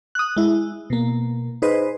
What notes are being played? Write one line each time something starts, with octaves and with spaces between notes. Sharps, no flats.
D#6 F#6
G#3 E4
B2 A#3
D#4 G#4 B4 C5 D#5